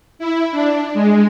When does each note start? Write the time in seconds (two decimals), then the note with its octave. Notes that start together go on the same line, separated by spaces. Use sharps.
0.19 E4
0.52 D4
0.94 G#3